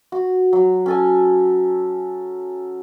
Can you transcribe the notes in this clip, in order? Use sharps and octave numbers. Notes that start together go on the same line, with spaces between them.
F#4
F#3
C#4 A4 G#5